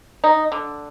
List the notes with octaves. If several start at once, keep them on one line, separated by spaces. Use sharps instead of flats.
D#4
D3